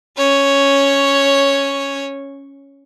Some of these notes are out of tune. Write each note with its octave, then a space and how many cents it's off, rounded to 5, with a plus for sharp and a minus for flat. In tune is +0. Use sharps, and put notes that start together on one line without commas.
C#4 +0 C#5 +0